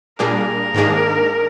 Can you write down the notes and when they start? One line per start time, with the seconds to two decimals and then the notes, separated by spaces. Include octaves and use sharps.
0.19 A#2 G3 A#3 D4 G#4 A#4
0.74 G#2 D#3 A#3 D4 G#4